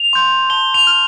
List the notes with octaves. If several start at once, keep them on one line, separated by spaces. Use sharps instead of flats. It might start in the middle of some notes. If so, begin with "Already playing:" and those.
Already playing: F7
C6 G6
A5 G7
F7
F6